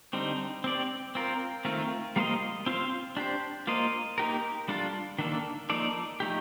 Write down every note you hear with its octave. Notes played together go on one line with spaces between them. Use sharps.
D3 G3 C4 D#4
C4 G4 D5
C4 F4 A#4
D#3 A3 C4 F4 A#4
G3 A#3 F4 C5 D#5
C4 F4 C5
D4 G4 C5
A#3 F4 C5 D#5
A#3 D#4 G4 A#4
G3 D4 F4 A4
D#3 A#3 D4 A4
F3 A#3 D#4 A4 D5
F3 A3 D#4 G4